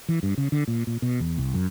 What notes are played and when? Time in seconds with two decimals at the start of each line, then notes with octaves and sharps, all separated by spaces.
0.08 E3
0.23 G2
0.38 C#3
0.52 D3
0.68 A#2
0.87 A#2
1.02 B2
1.20 E2
1.38 C2
1.54 F#2